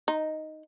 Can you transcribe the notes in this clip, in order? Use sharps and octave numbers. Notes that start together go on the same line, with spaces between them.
D#4